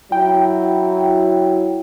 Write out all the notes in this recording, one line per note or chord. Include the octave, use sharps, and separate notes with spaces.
F#3 E4 G5